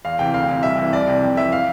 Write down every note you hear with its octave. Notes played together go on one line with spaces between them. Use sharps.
E2 F5
C3 E3 G5
D2 F5
C3 E3
C2 E5
C3 E3
C2 D5
C3 E3
F2
E3 E5
F5